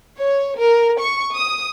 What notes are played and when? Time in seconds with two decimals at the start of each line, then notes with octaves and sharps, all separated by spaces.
0.18 C#5
0.59 A#4
0.99 C#6
1.33 D#6